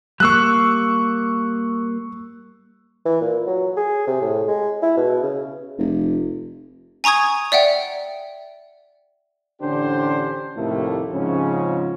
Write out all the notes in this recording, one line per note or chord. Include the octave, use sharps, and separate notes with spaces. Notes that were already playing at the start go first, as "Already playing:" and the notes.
G3 A#3 C#6 E6 F#6
E3
A#2
F#3
G#4
C3
A2
G#3
E4
B2
C#3
F1
G#5 A#5 C#6 D#6 G#6
D5 E5 F#5 G5
A1 D3 C#4 D4 G4 C5
D#2 A2 C3 F3 A3 A#3
G#2 C#3 F3 C4 C#4